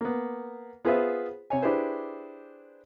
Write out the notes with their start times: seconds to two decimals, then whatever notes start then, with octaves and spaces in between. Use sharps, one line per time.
0.01 A#3 B3
0.85 B3 F4 G#4 B4 C5 E5
1.50 C3 C#5 G#5
1.62 D4 E4 G4 G#4 B4 C5